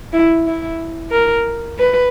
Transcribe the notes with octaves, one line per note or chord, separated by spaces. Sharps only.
E4
E4
A#4
B4